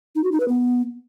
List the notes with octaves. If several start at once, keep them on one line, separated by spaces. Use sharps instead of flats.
D#4
F#4
D#4
B4
B3